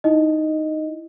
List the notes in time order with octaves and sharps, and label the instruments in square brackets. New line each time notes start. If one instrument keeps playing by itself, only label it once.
[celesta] D#4 E4 D#5